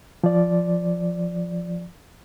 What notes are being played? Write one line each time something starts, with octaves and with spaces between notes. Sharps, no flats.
F3 D5